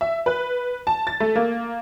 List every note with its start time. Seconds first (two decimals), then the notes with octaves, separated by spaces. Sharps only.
0.01 E5
0.26 B4
0.87 A5
1.07 A6
1.20 A3
1.36 A#3